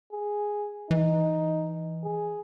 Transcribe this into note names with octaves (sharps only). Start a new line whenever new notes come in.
G#4
E3 D#4
G#4